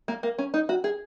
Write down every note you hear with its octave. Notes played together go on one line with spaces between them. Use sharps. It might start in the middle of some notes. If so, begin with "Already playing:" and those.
A#3
A#3
C#4
D#4
F#4
G#4